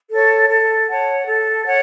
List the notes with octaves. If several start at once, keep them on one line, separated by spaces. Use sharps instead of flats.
A4 C#5
A4
C#5 F#5 A5
A4
C#5 F#5